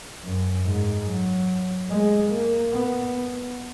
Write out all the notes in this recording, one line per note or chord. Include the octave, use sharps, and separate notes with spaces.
F#2
G#2
F#3
G#3
A#3
B3